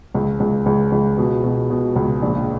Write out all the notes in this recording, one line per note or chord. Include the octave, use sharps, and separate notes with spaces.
C#2
C#2
C#2
C#2
B2
B2
B2
C#2
A#1